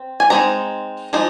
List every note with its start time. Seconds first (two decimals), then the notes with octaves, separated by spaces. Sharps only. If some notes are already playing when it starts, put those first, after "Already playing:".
Already playing: C4
0.20 G#5
0.30 G#3 C4 D#4 A#5
1.13 F3 G#3 D#4